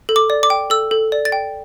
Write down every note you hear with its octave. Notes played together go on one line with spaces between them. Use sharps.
A4
D6
D5
D6
G5
A4 E6
A4
D5
A6
G5